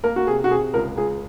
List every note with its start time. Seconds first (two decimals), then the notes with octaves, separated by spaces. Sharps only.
0.04 A#3 A#4
0.16 F#4
0.27 C3 G#4
0.44 F#4
0.51 C3 G#4
0.74 C#2 A#4
0.97 C#2 G#4